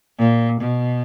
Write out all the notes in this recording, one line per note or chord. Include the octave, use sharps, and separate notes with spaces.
A#2
B2